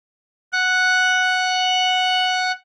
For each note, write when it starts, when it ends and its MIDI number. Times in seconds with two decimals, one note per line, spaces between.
0.53 2.52 78
0.53 2.52 90